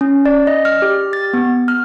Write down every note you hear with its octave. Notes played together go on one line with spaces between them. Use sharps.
C#4
D5
D#5
F6
G4
A6
B3
F6